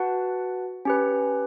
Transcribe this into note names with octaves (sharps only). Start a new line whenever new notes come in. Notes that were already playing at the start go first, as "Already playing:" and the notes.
Already playing: F#4 B4 F#5 A5
C#4 G4 B4